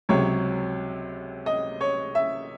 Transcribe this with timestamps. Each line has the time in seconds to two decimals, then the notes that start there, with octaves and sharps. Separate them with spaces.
0.09 C#2 C3 F#3 C#5
1.46 D#5
1.81 C#5
2.15 E5